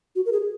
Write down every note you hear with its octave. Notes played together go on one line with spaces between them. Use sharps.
F#4
A#4
G#4